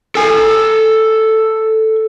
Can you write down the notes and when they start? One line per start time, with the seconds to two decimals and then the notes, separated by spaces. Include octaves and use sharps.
0.15 A4 G#5